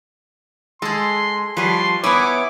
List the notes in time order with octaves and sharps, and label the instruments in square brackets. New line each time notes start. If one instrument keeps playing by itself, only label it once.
[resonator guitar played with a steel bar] G#3 [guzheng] G#4 A4 [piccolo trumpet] C6
[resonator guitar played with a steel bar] F3 G3 [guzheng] B4 C#5 [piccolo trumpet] C6
[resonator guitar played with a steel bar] B3 C#5 [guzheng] E4 G#5 B5 [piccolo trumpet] D6